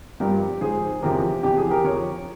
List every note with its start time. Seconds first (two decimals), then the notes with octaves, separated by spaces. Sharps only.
0.20 G2 F3 G4 A#4
0.61 G#2 F3 G#4 C5
1.02 E2 C3 F3 G4 A#4
1.43 F2 E3 G4
1.57 G#4
1.71 G4 A#4
1.84 F3 A#4 C#5